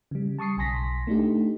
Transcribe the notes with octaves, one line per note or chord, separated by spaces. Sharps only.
C#3 G3
A5 C#6 D#6 C7 C#7
B1 G#5 C6 A#6 B6
A3 D4 D#4 G4